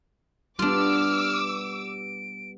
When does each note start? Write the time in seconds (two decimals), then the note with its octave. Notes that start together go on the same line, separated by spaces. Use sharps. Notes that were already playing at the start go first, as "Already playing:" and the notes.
0.59 G3 B3 D4 F4 D6 E6 F6
1.66 D7